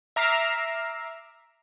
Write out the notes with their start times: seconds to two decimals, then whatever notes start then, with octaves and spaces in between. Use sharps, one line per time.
0.16 E5 A#5 D6 F6 C7 E7